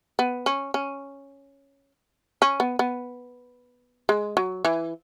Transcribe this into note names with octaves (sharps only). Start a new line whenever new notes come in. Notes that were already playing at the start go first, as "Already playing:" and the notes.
B3
C#4
C#4
C#4
B3
B3
G#3
F#3
E3